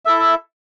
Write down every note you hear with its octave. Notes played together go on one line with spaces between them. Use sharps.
E4 A4 E5